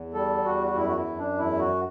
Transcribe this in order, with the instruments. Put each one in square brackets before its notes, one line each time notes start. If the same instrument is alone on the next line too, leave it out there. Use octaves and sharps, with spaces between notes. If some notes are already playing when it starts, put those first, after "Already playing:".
Already playing: [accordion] E2
G3 A4
E2 F#4
F#4
F#2 E4
F#4
E4
F#2
D4
E2 E4
F#4